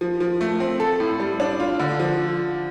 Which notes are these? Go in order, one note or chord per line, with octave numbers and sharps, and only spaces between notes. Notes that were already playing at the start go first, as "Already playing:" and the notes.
F3
F3
A3
C4
A4
A2
G3
D4
F4
D3
F3